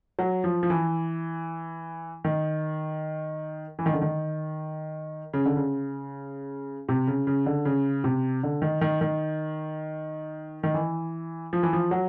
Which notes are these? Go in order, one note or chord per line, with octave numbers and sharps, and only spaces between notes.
F#3
F3
F3
E3
D#3
E3
D#3
D3
D#3
C#3
D3
C#3
C3
C#3
C#3
D3
C#3
C3
D3
D#3
D#3
D#3
D#3
E3
F3
E3
F3
F#3